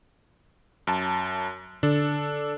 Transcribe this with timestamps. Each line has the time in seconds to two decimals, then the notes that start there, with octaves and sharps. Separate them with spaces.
0.87 F#2 A5
1.83 D3 D4 A4